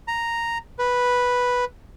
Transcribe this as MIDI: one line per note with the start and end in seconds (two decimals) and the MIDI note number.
0.08 0.58 82
0.79 1.65 71